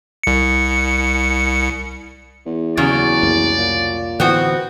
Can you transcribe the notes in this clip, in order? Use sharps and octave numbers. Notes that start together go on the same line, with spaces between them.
C2 C#7
E2
D#2 C#3 F#3 D5
C2 F2 A#3
A#2
A2 D3 E3 B3 C4 F#4